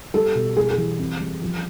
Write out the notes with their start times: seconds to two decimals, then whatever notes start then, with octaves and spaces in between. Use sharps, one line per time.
0.14 G3 A4
0.35 B2
0.57 G3 G#4
0.71 G#4
0.78 E3
0.99 C4
1.20 G3
1.41 F3